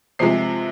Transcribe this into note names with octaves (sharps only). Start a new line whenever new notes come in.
C3 F3 G#3 C7